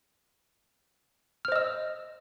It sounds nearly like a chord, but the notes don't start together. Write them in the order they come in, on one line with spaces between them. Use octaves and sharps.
F6 C5 D#5 E6